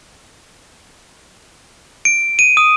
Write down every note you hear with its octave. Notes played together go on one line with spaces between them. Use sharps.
D7
D#7
D#6